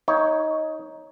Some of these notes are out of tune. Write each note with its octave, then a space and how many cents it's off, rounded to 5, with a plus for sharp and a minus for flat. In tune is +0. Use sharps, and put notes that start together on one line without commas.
D#4 +15 C#5 +0